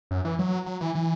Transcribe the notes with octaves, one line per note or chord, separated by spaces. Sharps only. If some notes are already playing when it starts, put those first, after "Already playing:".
F#2
E3
F#3
F#3
E3
E3